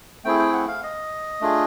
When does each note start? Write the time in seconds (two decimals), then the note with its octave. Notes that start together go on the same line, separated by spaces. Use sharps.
0.24 A3 C4 E4 G#4 G5
0.39 G5
0.53 F#5
0.68 F5
0.83 D#5
1.41 A3 D4 F4 G#4